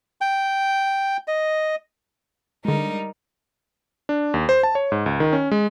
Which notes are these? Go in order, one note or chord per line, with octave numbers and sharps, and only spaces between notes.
G5
D#5
D3 G3 G#3 D#4 A#4
D4
D#2
C5
A5
C#5
G#2
C#2
D#3
C#4
G#3